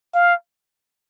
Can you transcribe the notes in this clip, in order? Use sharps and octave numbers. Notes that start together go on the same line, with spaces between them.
F5